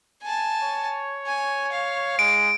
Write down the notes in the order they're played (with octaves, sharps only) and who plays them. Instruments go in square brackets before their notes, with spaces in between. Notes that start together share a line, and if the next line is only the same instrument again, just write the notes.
[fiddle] G#5 A5
[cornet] C#5
[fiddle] G#5
F5
[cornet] G#3 [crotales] D7